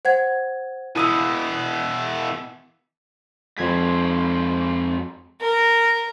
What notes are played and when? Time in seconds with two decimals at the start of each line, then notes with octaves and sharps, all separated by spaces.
0.05 C5 F#5 G#6
0.96 B2 E3 E4 D#6 E6
3.57 F2 G#2 C4 G#6 B6
5.40 A#4